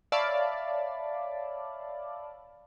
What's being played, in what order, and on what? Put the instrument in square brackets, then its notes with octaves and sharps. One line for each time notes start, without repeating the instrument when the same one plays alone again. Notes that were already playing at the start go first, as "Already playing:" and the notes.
[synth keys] C#5 D5 E5 F5 A5 B5